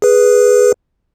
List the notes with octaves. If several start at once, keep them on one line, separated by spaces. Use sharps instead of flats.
G#4 B4